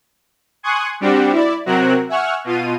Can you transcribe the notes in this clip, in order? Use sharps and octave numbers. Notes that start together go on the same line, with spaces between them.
G#5 C6 C#6 D#6 F#6 G#6
G3 C4 D4 F#4 G4
E4 D5
C3 F#3 C4 F#4 A#4 F#6
E5 F#5 G#5 C#6 F6
B2 F4 D#7